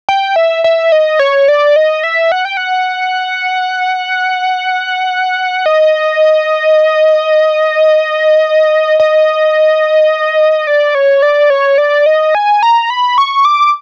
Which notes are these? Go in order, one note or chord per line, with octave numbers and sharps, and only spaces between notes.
G5
E5
E5
D#5
C#5
D5
D#5
E5
F#5
G5
F#5
D#5
D#5
D5
C#5
D5
C#5
D5
D#5
G#5
A#5
B5
C#6
D6